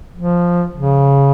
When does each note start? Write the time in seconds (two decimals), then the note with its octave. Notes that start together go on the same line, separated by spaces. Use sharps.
0.16 F3
0.73 C#3